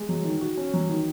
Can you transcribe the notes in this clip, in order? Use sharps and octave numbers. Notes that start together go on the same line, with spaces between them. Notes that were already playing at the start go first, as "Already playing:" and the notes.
Already playing: G#3
F#3
D#3
F#4
C#4
F#3
D#3